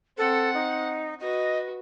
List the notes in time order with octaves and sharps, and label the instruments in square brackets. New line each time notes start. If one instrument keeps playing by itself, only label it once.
[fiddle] C4 F#5 [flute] A4
[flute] D#4
[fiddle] F#4 B4 [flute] D#5